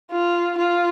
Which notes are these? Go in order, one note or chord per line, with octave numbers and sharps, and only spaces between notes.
F4
F4